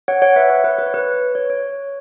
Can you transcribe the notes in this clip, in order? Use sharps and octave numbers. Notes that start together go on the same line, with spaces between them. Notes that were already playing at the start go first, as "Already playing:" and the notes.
C#5 F#5
C#5 F#5
B4 E5
C#5
B4
B4
C#5
B4
C#5
C#5